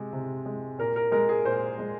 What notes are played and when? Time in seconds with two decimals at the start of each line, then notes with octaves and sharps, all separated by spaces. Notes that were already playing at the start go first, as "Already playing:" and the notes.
Already playing: C3 G#3
0.13 C3
0.46 G#3
0.78 A#2 A#4
0.96 A#4
1.12 G#3 A#4
1.29 G#4
1.44 A#2 C5
1.78 G#3